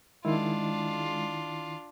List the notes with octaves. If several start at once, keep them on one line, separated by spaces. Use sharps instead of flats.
D#3 G#3 D4 E4 F4